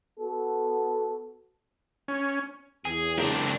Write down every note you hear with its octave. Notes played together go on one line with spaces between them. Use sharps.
B3 F#4 A4
C#4
E2 G#4
C#2 C4 D4 A#4